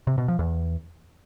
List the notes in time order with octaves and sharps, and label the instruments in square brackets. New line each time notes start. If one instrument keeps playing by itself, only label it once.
[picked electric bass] C3
B2
F3
E2